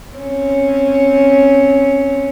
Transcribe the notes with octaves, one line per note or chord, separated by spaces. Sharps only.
C4 C#4